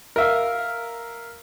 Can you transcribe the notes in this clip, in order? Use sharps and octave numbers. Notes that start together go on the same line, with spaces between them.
A#4 E5 F5